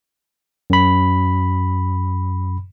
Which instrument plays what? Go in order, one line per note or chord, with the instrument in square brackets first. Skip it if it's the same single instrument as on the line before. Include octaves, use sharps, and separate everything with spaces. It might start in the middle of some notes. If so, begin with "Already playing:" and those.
[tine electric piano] F#2 B5